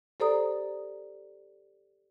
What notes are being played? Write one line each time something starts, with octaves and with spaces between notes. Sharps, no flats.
G4 A4 C5 D5 A#5 D#6